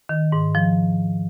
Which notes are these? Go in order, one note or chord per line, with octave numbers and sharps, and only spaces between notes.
D#3
G#2
F3